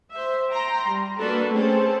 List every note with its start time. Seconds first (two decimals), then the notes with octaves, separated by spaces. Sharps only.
0.11 C5 E5
0.51 G5 A#5 C6
0.87 G3
1.17 A#3 D4 F#4 A4 B4
1.51 A3 C4 C#4 G#4 A4 C5